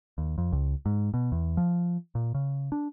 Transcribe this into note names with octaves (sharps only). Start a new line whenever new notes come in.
D#2
F2
C#2
G#2
B2
E2
F3
A#2
C#3
D4